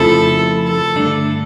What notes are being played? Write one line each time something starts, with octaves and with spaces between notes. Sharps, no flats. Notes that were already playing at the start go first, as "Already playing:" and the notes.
Already playing: F2 C#3 F3 A3 E4 A4
A4
G2 D3 A3 D4